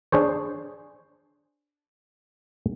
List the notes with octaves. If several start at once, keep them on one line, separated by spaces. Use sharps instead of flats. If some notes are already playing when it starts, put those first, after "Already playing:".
D4 G#4 C5 C#5